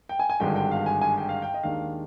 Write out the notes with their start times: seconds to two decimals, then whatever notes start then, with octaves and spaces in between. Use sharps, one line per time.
0.09 G5
0.19 G#5
0.30 G#5
0.40 G#1 G2 D3 G#3 D4 G5
0.56 G5
0.71 F5
0.86 G#5
1.01 G#5
1.17 G5
1.29 F5
1.42 G5
1.54 D#5
1.63 D#2 D#3 G#3 D4 F5